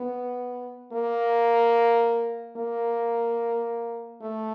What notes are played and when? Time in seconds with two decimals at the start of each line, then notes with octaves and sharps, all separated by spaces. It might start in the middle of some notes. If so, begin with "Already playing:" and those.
Already playing: B3
0.92 A#3
2.57 A#3
4.21 A3